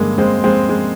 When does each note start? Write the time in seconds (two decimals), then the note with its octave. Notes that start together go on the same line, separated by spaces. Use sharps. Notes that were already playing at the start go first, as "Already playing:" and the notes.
Already playing: G2 D3 G#3 A#3
0.18 G#3 C4
0.44 G#3 C4
0.69 G#3